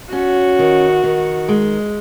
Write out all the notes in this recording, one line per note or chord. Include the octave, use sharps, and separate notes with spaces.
C#4 F#4
D#3
D#3
G#3